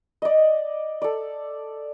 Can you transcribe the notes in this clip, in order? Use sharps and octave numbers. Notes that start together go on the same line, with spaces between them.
D5 D#5
A4 D5